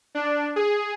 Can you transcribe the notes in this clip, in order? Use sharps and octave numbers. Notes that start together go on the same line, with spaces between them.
D4
G#4